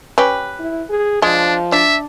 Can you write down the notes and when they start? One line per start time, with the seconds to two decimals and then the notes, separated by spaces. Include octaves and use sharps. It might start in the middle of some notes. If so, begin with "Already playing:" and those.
0.18 C#4 G4 B4
0.59 E4
0.90 G#4
1.22 F3 G#3 D4
1.72 D4 E5